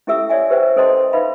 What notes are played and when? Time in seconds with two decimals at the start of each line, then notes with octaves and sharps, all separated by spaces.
0.07 C#4 E4 G4 A4 E5 E6
0.29 C#5 D5 E5 G#5
0.50 G4 B4 C5 E5 F#5 G5
0.76 C#4 A4 C5 D#5 A5 C6
1.13 D#4 B4 E5 F5 B5